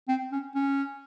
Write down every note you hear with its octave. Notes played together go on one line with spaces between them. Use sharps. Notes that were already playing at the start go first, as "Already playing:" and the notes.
C4
C#4
C#4